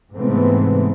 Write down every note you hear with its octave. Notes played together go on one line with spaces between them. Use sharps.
G#2 C3 E3 A3 B3 C4